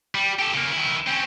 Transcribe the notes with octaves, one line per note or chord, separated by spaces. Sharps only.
G3
G4 A4
C#3 A#3
D#3 E4
C4 C#4